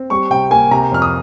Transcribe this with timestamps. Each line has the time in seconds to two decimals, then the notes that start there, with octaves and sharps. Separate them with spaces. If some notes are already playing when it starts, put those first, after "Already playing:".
Already playing: C4
0.10 G3 C#6
0.31 C3 G5
0.51 A#3 G#5
0.71 C3 A#5
0.92 F2 F6
1.02 D#6